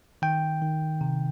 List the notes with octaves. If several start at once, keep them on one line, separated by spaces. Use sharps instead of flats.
D#3 G5
D#3
C3